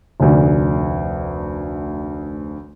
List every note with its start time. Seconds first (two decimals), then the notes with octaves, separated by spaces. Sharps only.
0.20 F1 D2